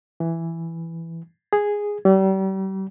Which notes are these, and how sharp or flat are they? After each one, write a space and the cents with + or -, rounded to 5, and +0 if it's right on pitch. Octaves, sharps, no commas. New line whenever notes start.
E3 +5
G#4 -5
G3 -35